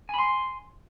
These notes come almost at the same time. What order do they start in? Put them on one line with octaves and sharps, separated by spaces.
G#5 B5 C6